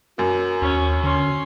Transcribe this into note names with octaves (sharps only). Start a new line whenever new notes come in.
F#2 A#3 F#4
D#2 C#4
D3 C#4 C6